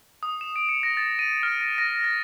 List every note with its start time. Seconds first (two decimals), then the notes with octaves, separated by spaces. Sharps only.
0.23 D#6
0.41 E7
0.56 D7
0.69 C#7
0.83 A#6
0.97 A6
1.19 D#7
1.43 F6
1.61 A#6
1.78 A#6
2.04 A6